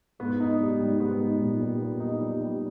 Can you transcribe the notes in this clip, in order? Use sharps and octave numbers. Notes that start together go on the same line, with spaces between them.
G#2 B3
D#4
G3
G#2 G3
B3
D#4
A#2 G3
G3
B3
D#4
G3
G3